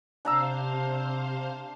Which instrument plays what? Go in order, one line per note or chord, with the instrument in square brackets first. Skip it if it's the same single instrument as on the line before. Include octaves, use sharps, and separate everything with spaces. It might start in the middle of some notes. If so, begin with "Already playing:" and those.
[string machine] C3 C5 F5 [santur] D4 A#5 E6